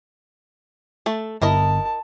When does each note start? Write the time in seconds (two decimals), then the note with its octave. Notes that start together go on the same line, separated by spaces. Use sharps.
1.06 A3 A4
1.42 G1 E4 A#4 D#5 A5